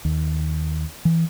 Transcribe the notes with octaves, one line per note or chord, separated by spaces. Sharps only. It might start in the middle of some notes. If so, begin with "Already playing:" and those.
D#2
E3